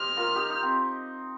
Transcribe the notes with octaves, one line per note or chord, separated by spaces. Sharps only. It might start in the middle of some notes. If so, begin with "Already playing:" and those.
Already playing: G4 C5 D#5 F6
F4 A#4
D#4 G4
D#4
C4